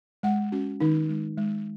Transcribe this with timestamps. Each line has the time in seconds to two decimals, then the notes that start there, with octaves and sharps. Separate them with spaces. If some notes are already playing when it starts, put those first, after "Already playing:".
0.23 G#3 F#5
0.52 C#4 F#4
0.80 D#3 D#4
1.09 G#3
1.38 G#3